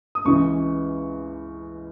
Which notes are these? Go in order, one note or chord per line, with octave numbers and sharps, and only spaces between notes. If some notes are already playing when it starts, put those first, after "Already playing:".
D#6
C#2 C#3 E3 C#6